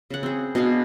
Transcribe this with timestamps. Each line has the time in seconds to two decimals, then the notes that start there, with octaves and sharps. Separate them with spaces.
0.10 C#3 F#5
0.23 C4 G#4
0.55 B2 D4 G#4 F5